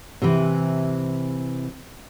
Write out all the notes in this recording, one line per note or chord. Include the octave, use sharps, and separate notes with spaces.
C3 E3